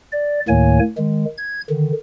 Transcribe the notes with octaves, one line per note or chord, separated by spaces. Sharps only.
D5
D2 A2 D#3 A#3 C#5 G#5
D#3 G#3
G#6
D3 D#3